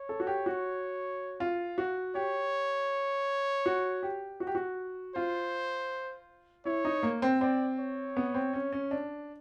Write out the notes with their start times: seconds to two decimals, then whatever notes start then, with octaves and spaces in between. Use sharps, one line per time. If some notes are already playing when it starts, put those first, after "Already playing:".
Already playing: C#5
0.09 A4
0.20 F#4
0.27 G4
0.46 F#4
1.40 F4
1.78 F#4
2.15 G4 C#5
3.66 F#4
4.03 G4
4.40 F#4
4.47 G4
4.55 F#4
5.15 F4 C5
6.65 E4 C#5
6.85 D#4
7.03 A#3
7.22 C4
7.41 C4 D5
7.79 C#5
8.17 B3
8.35 C4
8.53 C#4
8.73 C#4
8.91 D4